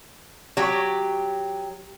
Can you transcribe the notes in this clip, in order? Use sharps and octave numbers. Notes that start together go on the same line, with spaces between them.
F#3 G4